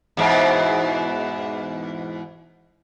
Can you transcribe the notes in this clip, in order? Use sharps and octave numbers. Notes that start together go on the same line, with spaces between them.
E2 G#2 B2